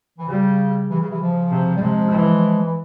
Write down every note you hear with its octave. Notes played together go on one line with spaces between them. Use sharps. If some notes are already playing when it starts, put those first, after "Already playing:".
E3
C#3 G3
C3 E3
C#3
C3 E3
C#3 F3
C3
G3
C3 F3 G#3
E3
E3